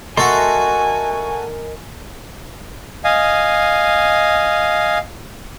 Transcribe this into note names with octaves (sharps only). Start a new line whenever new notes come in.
A3 F#4 A#4 D#5 G#5 C6
D#5 F5 G#5